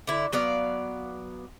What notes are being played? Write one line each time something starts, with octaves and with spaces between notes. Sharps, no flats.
D3 E4
F#3 B3 D5 F5